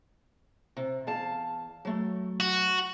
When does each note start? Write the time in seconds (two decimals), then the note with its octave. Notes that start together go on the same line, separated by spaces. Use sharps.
0.77 C3
1.07 E2 F5 A5
1.85 F#3 A3
2.40 F#4